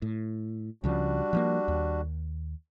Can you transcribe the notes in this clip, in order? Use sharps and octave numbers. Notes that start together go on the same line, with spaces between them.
A2
C#2 C#3 F3 G3 D4 F#4
F3 F#3 A#3
D#2